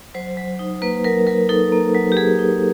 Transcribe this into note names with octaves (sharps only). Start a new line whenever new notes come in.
F#3 C5
F#3
D#4
A#3 B4
F#3 A#4
F#3 A#4
D#4 A4
A#3
F#3
G4
F#3 G#4
D#4